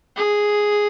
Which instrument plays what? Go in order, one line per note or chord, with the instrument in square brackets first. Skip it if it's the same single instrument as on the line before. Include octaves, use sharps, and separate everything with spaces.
[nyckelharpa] G#4